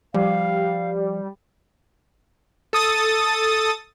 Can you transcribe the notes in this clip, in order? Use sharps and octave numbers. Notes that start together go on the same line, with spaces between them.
F3 G3 F5
A4 D#6 A6